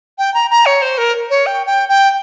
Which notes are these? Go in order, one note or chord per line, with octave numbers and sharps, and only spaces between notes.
G5
A#5
A#5
C#5
C5
A#4
C#5
G5
G5
G5